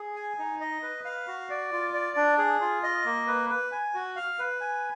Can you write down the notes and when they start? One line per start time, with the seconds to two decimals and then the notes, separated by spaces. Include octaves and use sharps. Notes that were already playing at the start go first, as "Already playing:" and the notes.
Already playing: G#4
0.16 G#5
0.39 D#4
0.61 D#5
0.83 B4
1.05 F5
1.27 F#4
1.50 D5
1.72 F4
1.94 D5
2.16 D4
2.38 G#4
2.61 F4
2.83 D#5
3.05 A#3
3.27 B4
3.49 B4
3.72 G#5
3.94 F#4
4.16 F5
4.39 B4
4.61 G#5